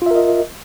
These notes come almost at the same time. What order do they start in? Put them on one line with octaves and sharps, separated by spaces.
F4 E5 A#4 D#5